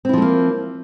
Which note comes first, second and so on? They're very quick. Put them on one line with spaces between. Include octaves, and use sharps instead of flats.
C4 E4 F3 A3 A#3